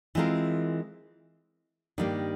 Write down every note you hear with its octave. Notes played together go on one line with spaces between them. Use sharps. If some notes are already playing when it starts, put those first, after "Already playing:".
E3 G#3 C4 F4 A#4
G2 D#3 G3 A#3